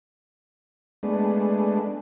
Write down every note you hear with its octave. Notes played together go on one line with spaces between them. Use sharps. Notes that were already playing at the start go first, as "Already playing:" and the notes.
G#3 A3 B3 D4